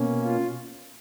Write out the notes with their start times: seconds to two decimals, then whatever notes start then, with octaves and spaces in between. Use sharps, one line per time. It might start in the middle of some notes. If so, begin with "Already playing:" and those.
Already playing: B2 A#3 C#4
0.23 F4